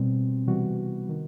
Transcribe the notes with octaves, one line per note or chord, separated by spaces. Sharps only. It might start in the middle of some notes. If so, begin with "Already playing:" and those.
Already playing: B2 G3 C4
C3 E3 G3 B3 F#4
D#3